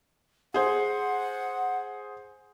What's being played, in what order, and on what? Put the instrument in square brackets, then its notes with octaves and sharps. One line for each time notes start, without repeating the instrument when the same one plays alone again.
[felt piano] G#4 C5 [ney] F#5